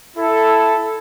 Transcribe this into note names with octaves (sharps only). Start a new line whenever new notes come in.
E4 A4